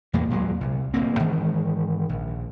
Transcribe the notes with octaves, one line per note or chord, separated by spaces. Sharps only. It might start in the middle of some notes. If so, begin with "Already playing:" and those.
E2 A2 A#3
D#2 A#2 F#3 G#3
C2
D1 D2 A#3 C4
G#2 D#3 E3
A#1